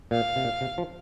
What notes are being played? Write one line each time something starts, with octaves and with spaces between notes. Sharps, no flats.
A#2 F5
C3
A#2
C3
F3